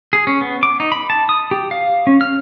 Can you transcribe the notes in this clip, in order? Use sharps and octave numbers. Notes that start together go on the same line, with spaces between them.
G#4
C#4
B3
D6
D#4
B5
A5
D#6
G4
F5
C#4
F6